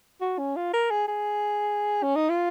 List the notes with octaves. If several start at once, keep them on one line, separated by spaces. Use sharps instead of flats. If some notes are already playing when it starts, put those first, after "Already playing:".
F#4
C#4
F4
A#4
G#4
G#4
C#4
D#4
F4